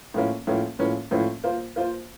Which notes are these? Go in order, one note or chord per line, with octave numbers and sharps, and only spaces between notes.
A2 F3 A#3 C#4
A2 F3 A#3 C#4
A2 F3 A#3 C#4
A2 F3 A#3 C#4
A#3 F4 C5
A#3 F4 C5